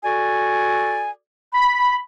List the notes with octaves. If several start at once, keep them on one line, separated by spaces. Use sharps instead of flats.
F#4 A4 D5 G#5
B5